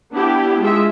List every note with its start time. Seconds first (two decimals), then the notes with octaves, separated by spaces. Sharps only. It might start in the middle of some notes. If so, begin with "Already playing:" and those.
0.11 B3 D4 E4 G4
0.60 G#3 F4 E5